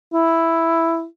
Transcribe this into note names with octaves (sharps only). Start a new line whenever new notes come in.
E4